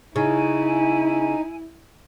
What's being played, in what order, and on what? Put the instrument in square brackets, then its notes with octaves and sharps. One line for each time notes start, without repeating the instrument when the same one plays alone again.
[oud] C#3 [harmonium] D#4 [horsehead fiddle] E4 [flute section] G#5